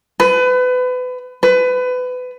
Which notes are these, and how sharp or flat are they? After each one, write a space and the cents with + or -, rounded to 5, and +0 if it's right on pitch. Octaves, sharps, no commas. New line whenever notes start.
B4 +30
B4 +25